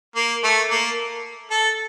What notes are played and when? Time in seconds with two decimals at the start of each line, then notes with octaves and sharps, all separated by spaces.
0.16 A#3
0.44 A3
0.70 A#3
1.51 A4